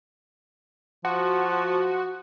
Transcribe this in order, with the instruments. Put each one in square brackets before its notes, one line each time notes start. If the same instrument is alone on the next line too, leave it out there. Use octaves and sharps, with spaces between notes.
[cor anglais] F3 [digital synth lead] F#4